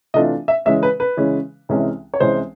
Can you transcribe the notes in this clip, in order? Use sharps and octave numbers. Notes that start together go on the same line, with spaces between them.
C3 E3 A3 D4 F4 D#5
E5
C#3 E3 G#3 C#4 E5
B4
B4
C#3 E3 G#3 C#4
C2 C3 E3 G#3 C#4
C#5
C2 C3 E3 G#3 C#4 C5